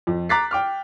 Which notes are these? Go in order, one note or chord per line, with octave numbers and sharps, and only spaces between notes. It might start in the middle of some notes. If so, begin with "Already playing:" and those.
F2
A#5 D6 F#6 A6 B6 C7
G5 D6 F6